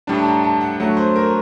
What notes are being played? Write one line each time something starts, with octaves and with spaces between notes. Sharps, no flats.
A2 G3 D4 A5
A5
A#5
A5
F#5
F#3 A3 D4 F#5
C5
A#4